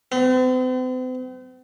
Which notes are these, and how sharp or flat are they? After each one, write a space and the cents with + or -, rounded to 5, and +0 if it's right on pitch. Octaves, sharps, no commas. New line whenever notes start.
C4 -45